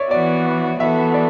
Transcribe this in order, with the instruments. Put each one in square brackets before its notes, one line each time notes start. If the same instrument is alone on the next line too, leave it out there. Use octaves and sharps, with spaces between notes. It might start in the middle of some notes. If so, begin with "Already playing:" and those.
Already playing: [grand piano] C#5 D5 E5
[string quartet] E3 B3 F#4 [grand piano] D5
[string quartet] E3 B3 F#4 A4 [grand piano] E5
[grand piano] D5